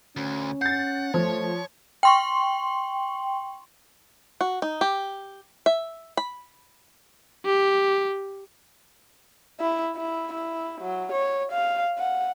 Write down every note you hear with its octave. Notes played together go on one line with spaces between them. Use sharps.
D2 C#4
F#5 G6 A6 C7
F3 A3 C5 C#5
G5 C6 C#6
F#4
D#4
G4
E5
B5
G4
E4
E4
E4
F#3
C#5
F5
F#5